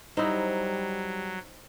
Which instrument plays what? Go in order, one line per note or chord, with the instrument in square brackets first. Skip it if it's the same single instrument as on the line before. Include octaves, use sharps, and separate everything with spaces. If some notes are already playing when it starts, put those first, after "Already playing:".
[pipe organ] F#3 [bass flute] G3 [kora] D#4 E4 [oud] C5